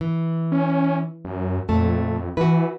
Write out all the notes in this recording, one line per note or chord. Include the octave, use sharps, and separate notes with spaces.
E3
C#4
F#2
F2 A#2 A3 A5
E3 F#4 B4